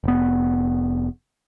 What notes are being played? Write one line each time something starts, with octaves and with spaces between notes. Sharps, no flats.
F1 B3